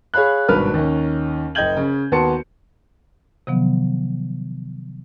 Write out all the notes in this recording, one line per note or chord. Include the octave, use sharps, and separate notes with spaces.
G#4 C#5 F5 B5 F#6
G#1 G2 B2 B4 F6
D#2 D#3 C#4
F#1 D#5 G5 G6 G#6 F#7
C#3
D#2 B3 F#4 A5 C6 C#7
C3 D#3 F3 F#3 B3